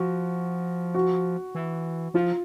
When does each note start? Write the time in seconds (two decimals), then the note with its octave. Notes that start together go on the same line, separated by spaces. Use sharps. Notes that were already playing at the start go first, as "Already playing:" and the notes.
Already playing: F3 F#4
0.94 F#4
1.55 E3
2.14 F3 F4